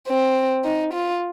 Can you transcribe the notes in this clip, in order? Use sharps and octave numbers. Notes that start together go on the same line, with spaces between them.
C4
D#4
F4